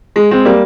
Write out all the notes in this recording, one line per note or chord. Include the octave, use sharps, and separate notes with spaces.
G#3
G#3 C4
G3 A#3